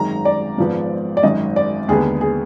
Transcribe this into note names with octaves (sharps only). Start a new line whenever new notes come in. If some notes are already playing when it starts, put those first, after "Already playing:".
Already playing: G#1 F#2 D#3 G#3 A#5
D5
G#1 G#2 F3 B3
D5
G#1 F#2 D#3 D#5
D5
D#2 D3 G#3 B3 G#4
G#4